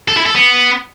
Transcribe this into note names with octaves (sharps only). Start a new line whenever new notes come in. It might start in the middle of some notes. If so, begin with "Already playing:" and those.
A4
E4
A4
B3